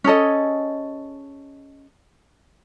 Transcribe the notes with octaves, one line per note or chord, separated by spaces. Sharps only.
C#4 G#4 A4 D#5